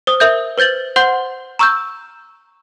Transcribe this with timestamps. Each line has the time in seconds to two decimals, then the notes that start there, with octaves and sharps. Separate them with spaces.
0.07 C5 D#6
0.20 A#4 E5 D#6 G6
0.58 B4 C5 G6 A6 F#7
0.96 C5 F#5 C6 G6
1.59 A#5 C#6 E6 F6 G6